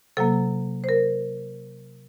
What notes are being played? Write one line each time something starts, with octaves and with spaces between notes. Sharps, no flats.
C3 F#3 A#3 A4
C5
A#4